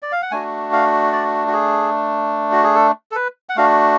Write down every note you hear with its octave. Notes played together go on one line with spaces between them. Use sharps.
D5
F5
F#5
A3 D4 F#4 G#5
F5
D5
F#4
G#4
F#4
G#4
A4
A4
B4
F#5
A3 D4 F#4 F5